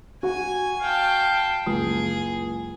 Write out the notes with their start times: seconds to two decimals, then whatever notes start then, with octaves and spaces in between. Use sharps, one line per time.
0.23 F#4 F#5 G#5
0.81 F5 G5 A5
1.66 F#1 C#2 G#4 D#6